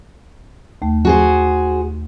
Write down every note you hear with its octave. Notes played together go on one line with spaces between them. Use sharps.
D#2 A3
F#4 G#4 C5